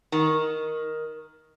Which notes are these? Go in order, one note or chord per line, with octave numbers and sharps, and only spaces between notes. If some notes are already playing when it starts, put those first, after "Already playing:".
D#3